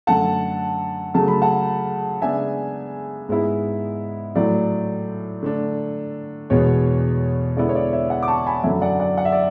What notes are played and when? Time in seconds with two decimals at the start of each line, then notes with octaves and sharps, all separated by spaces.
0.07 F#2 D3 A3 F#5 A5
1.14 C#3 F#3 A3 A5
1.28 B5
1.42 F#5 A5
2.21 C#3 G#3 B3 D4 E5 G#5
3.29 G#2 G#3 B3 E4
4.35 A2 F#3 A3 D5
5.43 D3 A3 D4
6.50 E2 B2 G#3 B3 C#5
7.57 D3 G#3 B3 E4 D5
7.69 C#5
7.75 D5
7.93 C#5 E5
8.10 D5 F#5
8.23 D6
8.28 A5 C#6
8.46 G#5 B5
8.63 F#2 D3 F#3 E5 G#5
8.82 D5 F#5
9.00 D5 F#5
9.18 F#5
9.25 E5
9.32 D5